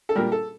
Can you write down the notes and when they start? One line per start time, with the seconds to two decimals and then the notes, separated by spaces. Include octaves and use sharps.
0.09 A4
0.15 A#2 G3 A#4
0.32 A4